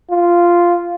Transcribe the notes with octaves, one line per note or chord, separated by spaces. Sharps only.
F4